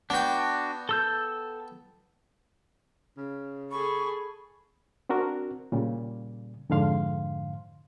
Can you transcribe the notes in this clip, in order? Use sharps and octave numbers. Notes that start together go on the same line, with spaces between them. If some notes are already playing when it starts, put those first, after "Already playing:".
B3 D4 F#4 G5
A4 E6 G6
C#3
G#4 A4 B5 C#6
C4 D4 F#4 A#4
A#2 C#3 G3
F2 G#2 D3 F5 C6